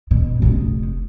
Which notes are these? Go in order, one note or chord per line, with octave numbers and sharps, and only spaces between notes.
B2
F1 D#4